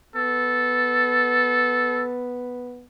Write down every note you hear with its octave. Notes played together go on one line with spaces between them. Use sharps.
B3 A4